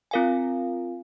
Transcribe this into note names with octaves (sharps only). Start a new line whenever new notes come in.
C4 F4 A#4 F5 G#5